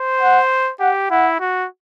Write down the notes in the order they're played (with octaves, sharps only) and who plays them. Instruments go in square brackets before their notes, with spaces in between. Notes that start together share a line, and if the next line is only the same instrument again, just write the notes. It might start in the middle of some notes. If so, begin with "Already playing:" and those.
Already playing: [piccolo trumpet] C5
[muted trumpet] F#5
[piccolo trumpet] G4 [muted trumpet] F#5
[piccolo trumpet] E4 [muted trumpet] F#5
[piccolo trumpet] F#4